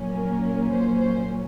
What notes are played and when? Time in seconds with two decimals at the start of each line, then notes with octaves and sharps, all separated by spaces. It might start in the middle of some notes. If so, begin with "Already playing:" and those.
Already playing: A#1 A#2 F#3 A#3 C#4
0.15 A#4
0.72 C5
1.00 C5